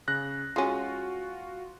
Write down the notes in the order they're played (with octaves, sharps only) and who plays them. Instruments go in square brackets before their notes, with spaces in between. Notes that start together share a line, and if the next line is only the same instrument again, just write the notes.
[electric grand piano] C#3 F#6 A#6
[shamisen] G#3 C#4 [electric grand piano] F4 F#4